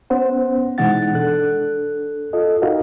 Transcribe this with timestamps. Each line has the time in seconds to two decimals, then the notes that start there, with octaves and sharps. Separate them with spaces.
0.10 B3 C#4 C5 F#5
0.78 B2 E3 G#3 D#4 F#5 A6
1.14 D4 A4 F#6
2.33 F4 A4 D#5
2.62 D#4 F#4 G4 A#4 D#5 F5